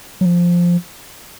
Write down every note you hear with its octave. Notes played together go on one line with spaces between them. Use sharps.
F#3
F3